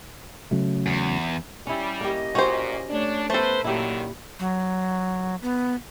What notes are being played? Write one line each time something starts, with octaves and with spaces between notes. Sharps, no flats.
C#3 F#3 A3
E2
G3 C#4 E4
A#3 C#4 G4 D#5
A#2 C#4 F#4 G4 C5
A3 D4 C#5
A3 B3 A4 B4 C5
A#2 D3 D#3 F#3 E4 G4
F#3
B3